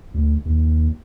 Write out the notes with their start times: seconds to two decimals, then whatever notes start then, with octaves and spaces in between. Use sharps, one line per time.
0.14 D2
0.45 D#2